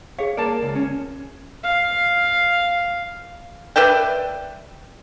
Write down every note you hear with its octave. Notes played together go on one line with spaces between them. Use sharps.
G#4 C#5 F5
A#3 D5 A5
C#2
C#4
F5
B4 D5 E5 G5